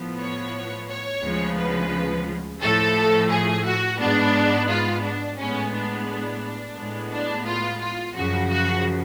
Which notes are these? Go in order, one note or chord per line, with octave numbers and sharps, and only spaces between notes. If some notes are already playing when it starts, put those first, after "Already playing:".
Already playing: A2 F3 B3
C#5
C#5
D2 C#3 F3 G#3 B3
B4
A2 F3 A3 A4
G#4
F#4
G#2 G#3 B3 D4
F4
D4
A2 G#3 B3 C#4
D4
D4
A2 G#3 B3
D4
F4
F4
F#2 C#3 F3 F#4
F#4